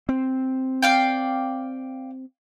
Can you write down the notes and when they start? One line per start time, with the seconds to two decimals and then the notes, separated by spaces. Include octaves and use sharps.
0.09 C4
0.82 D5 F5 G5